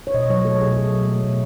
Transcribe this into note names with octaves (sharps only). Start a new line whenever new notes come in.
C#5
B2 D#5
F#3 C#5
A3 A4
B2 G#4
B2 A4
F#3
A3
B2